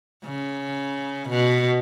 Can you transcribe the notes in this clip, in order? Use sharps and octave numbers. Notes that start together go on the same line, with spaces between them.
C#3
B2